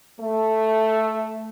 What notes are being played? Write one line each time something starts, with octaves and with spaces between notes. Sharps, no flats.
A3